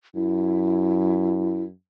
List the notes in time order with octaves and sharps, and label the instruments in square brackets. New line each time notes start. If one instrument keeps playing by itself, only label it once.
[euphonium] F#2 [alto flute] E4